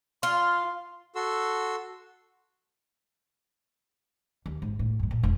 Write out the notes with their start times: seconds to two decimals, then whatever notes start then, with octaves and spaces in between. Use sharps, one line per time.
0.23 F4 C6
1.15 F#4 A4 C6 E6
4.46 D#2
4.62 G#1
4.79 A2
4.99 F#2 A#2
5.11 A#2
5.23 E1